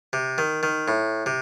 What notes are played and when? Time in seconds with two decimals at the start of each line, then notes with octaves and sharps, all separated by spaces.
0.13 C3
0.38 D#3
0.63 D#3
0.88 A2
1.26 C3